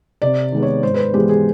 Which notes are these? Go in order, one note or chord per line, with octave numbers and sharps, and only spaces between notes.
C3 D5
D#3 G#3 B3
C#5
G#2 C5
B4
C5
E3 G#3 B3 G4
G#4